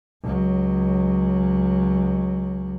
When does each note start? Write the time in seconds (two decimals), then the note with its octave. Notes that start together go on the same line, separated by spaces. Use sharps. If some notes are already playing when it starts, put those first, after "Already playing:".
0.23 C#2 F#3